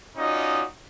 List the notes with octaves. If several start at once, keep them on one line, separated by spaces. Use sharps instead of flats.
C#4 D#4 F4 F#4 D5 D#5